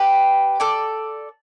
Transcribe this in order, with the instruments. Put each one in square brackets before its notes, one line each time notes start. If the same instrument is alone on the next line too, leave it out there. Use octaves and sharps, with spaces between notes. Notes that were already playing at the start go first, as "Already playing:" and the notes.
Already playing: [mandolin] G4 B4
A4 D5